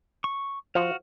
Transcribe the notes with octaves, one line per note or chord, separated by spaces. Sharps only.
C#6
F3 F#4 F5